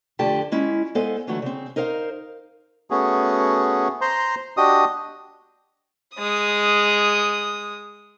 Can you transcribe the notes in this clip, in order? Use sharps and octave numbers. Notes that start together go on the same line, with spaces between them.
F2 D3 A3 G4 A5
G#3 C#4 E4
G#3 B3 A4 C5 F5 G#5
D3 E3 F#3 A3 F#4
C#3 C4
D#4 A#4 C5 D5 F5
A3 B3 C#4 F#4 G#4
C5 A#5 C6
D4 F#4 G4 D#5 D#6
G#3 D#6